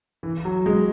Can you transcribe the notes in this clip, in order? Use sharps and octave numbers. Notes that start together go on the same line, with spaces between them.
E3
F#3
G#3